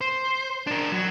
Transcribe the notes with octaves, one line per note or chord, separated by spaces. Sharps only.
C5
D4 A#4
F#3